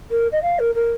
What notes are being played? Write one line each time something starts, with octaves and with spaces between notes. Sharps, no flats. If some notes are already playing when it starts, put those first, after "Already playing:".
A#4
D#5
F5
A#4
A#4